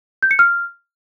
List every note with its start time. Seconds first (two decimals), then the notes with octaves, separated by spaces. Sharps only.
0.23 G6
0.31 C#7
0.39 F6